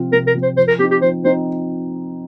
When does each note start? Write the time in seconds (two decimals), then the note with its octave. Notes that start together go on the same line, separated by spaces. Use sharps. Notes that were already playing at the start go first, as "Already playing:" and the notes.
Already playing: C3 F3 C4 F4
0.12 C3 A#4
0.27 A#4
0.34 F3 C4 F4
0.43 C5
0.57 F3 C5
0.68 A#4
0.79 C4 G4
0.83 D#4
0.91 G4
1.02 F3 C5
1.24 C4 D#4 C5